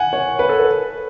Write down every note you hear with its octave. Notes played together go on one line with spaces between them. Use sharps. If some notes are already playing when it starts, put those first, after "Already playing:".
Already playing: F#5 G#5
C#5
B4
A4
B4